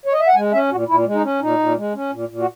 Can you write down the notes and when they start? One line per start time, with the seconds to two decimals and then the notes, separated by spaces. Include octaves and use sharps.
0.06 C#5
0.13 D#5
0.20 E5
0.28 F#5
0.35 G#3 G#5
0.53 C#4 E5
0.71 A#2 F#4
0.88 A#2 E4
1.06 G#3
1.14 D#4
1.23 C#4
1.41 A#2 D#4
1.59 A#2
1.76 G#3
1.94 C#4
2.12 A#2
2.29 A#2
2.39 F#4